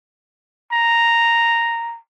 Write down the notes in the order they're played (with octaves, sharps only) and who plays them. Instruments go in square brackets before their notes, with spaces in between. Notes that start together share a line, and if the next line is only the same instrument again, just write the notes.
[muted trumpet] A#5